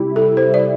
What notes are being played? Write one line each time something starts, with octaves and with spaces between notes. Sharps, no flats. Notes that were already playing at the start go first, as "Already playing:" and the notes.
Already playing: C3 G3 E4 G4
A4
C5
D5